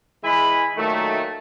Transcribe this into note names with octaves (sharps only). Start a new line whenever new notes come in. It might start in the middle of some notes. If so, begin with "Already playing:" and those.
E3 G#3 E5 G#5 B5
A#2 D#3 F#3 A3